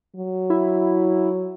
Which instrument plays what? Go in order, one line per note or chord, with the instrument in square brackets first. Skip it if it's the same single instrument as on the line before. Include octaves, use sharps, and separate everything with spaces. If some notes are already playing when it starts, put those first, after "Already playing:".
[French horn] F#3
[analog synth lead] E4